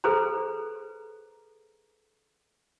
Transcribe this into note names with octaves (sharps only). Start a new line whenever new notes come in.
G#4 A4 B4 C5 A#5